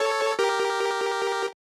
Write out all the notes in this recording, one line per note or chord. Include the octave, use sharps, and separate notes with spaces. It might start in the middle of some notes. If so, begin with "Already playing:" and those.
Already playing: A4 C#5
G4 A#4